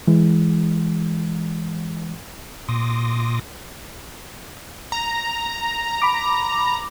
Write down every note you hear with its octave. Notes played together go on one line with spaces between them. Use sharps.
E3 G#3
A#2 C6 D6 D#6 A#6
A#5
B5 D6